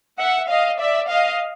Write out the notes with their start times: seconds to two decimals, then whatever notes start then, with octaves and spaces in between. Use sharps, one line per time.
0.18 E5 F#5
0.49 D#5 F5
0.79 D5 E5
1.09 D#5 F5